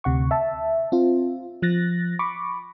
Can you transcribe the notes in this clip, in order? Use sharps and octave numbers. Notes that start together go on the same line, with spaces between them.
D2 C3 F#5 C#6
E5 A5
C4 F4
F3 F#6 A6 A#6
B5 C#6 D6